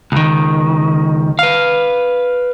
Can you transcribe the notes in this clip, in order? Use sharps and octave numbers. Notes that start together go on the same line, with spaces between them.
C#2 D#3
B4 F5